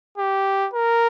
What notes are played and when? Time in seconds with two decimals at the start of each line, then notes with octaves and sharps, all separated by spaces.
0.18 G4
0.74 A#4